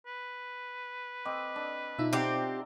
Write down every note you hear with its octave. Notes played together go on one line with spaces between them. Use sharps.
B4
C4 D#5 D6
D4
B2 D#4 F4 E5
C4 G4 D5 F#5 A#5